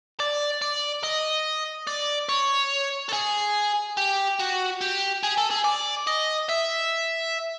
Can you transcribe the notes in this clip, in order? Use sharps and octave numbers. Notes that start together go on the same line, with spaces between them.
D5
D5
D#5
D5
C#5
A4
G#4
G4
F#4
G4
G#4
A4
G#4
D5
D#5
E5